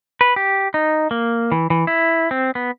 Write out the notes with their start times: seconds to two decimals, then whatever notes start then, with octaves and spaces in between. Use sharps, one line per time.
0.21 B4
0.36 G4
0.74 D#4
1.11 A#3
1.52 E3
1.70 E3
1.87 E4
2.31 C4
2.55 B3